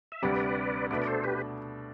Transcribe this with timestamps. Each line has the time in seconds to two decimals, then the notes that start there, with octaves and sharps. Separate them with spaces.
0.12 E5
0.22 D2 C3 G3 D4 B4 D5
0.91 B2 A3 D4 B4 D5
1.02 D5
1.07 A4 C5
1.24 G4 B4